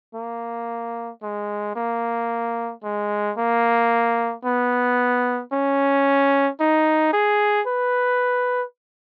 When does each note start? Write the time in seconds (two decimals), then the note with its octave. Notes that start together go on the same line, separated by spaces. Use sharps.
0.15 A#3
1.22 G#3
1.76 A#3
2.84 G#3
3.37 A#3
4.45 B3
5.52 C#4
6.60 D#4
7.13 G#4
7.67 B4